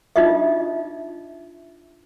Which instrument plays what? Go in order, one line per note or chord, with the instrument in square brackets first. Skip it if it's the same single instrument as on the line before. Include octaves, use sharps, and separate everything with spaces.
[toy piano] D4 D#4 F4 D#5 E5